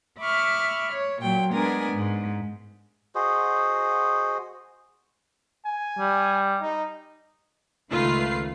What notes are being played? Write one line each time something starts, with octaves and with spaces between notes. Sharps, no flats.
E5 B5 C#6 D6 F6
C#5
A#2 F#3 G5
G#3 B3 D4 A#4 G#5
G#2
F#4 G#4 C5 D#5
G#5
G3
D#4
C#2 D#3 A3 F4 B4 C7